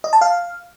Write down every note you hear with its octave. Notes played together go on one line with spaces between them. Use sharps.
D#5
A5
F5